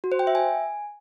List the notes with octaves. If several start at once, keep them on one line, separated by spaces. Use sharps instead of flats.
F#4
C5
G5
E5
G#5